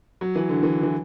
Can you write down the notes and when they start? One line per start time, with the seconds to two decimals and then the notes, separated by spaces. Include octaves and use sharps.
0.21 F#3
0.36 E3
0.49 D3
0.63 E3
0.83 E3